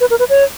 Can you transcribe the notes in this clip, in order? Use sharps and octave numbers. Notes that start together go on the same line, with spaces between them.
B4
A#4
B4
C#5